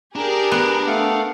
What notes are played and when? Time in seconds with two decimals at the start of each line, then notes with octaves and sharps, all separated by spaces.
0.16 D4 G4 G#4 A#4
0.52 B3
0.87 A3 F5 F#5